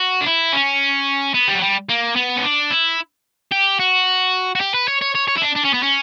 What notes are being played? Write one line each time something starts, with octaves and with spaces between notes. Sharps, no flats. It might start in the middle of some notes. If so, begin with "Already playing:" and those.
Already playing: F#4
D4
E4
C#4
B3
G3
F#3
G3
A#3
B3
C#4
D4
E4
G4
F#4
F#4
G4
B4
C#5
C#5
C#5
C#5
E4
D4
D4
C#4
B3
C#4